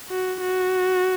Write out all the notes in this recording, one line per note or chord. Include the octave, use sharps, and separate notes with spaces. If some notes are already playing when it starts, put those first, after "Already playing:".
F#4
F#4